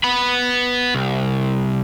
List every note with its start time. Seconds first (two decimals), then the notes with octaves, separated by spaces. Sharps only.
0.04 B3 B5
0.94 C2